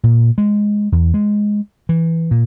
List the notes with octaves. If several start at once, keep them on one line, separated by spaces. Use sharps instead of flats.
A#2
G#3
E2
G#3
E3
A#2